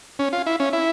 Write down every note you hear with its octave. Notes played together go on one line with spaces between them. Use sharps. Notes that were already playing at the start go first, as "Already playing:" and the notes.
C#4
F4
E4
C#4
E4